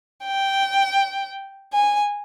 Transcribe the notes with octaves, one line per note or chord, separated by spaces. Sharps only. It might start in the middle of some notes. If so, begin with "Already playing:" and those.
G5
G#5